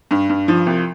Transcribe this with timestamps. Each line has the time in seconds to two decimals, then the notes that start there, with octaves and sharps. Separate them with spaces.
0.11 G2
0.29 G2
0.48 F3
0.66 C2